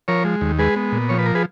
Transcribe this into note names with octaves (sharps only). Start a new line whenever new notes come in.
F3 A#4 C#5
G#3
D#2
G#3 G#4 B4
B3
A#2
F3 C#5
B4
A#4
G#4 B4